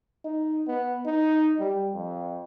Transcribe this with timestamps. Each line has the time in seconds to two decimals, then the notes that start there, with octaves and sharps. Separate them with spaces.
0.25 D#4
0.68 B3
1.06 D#4
1.60 G3
1.94 F2